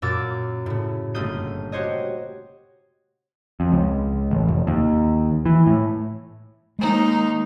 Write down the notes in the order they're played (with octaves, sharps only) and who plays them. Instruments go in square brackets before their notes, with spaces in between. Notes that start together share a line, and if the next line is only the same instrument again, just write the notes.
[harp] F#2 A#2 A#4 D6 E6 A6
A2 C#3
G1 A3 A#3 D#6 G6 D#7
F#4 G4 C5 C#5 D#5
[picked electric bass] F2
C#2
A1
F1
D#2
E3
A2
[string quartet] D#2 D#4 [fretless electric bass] G#3